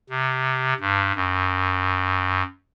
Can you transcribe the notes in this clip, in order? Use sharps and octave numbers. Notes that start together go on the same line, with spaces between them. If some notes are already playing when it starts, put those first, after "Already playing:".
C3
G2
F#2